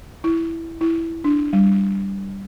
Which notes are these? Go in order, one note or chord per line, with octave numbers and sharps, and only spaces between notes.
E4
E4
D4
G3